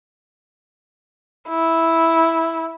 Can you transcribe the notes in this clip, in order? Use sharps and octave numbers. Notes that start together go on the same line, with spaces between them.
E4